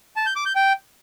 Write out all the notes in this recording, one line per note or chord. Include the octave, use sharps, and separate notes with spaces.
A5
G6
D6
G6
G5